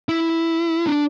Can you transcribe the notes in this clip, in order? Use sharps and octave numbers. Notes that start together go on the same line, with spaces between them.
E4
D4